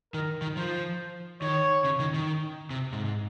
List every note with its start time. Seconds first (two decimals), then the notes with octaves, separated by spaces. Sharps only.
0.14 D#3 A#4
0.42 D#3
0.57 F3 C5
1.42 D#3 C#5
1.85 C#3
2.00 D#3
2.14 D#3
2.70 C3
2.93 G#2